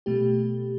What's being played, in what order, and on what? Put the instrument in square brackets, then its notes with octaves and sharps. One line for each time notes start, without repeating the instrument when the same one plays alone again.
[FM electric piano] B2 A3 G4